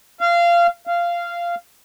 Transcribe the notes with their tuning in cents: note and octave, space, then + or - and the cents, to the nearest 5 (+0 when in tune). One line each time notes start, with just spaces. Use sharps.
F5 -20
F5 -15